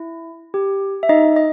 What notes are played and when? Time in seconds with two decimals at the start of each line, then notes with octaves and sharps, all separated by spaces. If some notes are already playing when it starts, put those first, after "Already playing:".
Already playing: E4
0.54 G4
1.03 E5
1.09 D#4 D#5
1.36 D#5